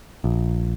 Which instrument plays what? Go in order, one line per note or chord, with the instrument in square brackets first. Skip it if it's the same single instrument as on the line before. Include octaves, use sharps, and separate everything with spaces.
[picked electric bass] A#1